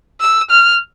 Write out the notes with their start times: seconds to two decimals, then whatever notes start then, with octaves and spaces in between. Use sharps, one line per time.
0.21 E6
0.51 F6